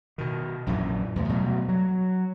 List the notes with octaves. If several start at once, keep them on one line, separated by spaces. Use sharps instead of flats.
B2 D#3
A#1 F#2 A#2 E3
E2 A2 C3
B2 F#3 G3 A3
F#3